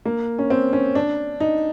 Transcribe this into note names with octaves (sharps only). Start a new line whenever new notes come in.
A#3
C#4
C4
C#4
D4
D#4